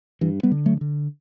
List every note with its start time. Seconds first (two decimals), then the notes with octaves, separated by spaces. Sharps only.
0.21 G2 E3
0.43 G3 B3
0.51 D3
0.66 F#3 A3
0.81 D3